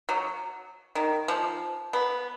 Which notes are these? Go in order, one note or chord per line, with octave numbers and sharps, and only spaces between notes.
F#3
D#3
F3
B3